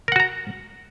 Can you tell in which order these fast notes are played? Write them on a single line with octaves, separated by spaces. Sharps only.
A#4 F#5 F#4 A#5